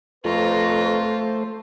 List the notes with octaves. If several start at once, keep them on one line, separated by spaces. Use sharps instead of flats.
F2 A3 F4 B4 C5 A#5 C#6